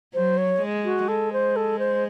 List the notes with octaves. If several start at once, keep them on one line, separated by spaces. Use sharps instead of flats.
F#3 C5
C#5
G#3
F#4
G#3 A4
C5
A4
C5